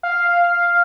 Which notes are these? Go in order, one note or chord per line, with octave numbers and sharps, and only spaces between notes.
F5